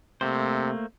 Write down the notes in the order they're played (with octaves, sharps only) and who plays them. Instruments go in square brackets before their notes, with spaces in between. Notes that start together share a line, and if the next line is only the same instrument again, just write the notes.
[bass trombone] C3 [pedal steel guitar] A3 A#3 C5